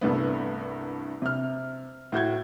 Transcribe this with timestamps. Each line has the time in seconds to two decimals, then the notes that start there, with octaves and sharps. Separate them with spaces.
0.01 C2 G2 A3 B3
1.22 C3 F6
2.12 A2 F#4 G6 G#6